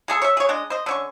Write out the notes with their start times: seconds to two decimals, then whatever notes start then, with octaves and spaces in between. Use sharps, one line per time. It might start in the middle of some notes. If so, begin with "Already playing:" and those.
0.08 G#3 G#4 A4
0.22 C#5 E5
0.37 G#4 C#5
0.49 G#3 D4 D#5
0.70 C5 D#5
0.86 D3 C#4 C#6